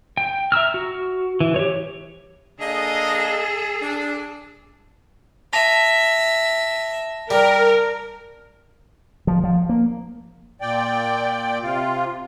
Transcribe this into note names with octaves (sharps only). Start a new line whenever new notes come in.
G5
E5 A#5 E6 F6
F#4
E3
G4 C#5
A#3 D4 G#4 A4 D#5
D4
E5 A5 A#6 F7
G3 A#4
F3
F3
A#3
A#2 D5 G5
C3 F4